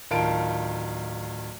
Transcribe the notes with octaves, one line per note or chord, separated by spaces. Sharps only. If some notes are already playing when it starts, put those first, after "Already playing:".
D1 D#3 F4 F5 A5 D7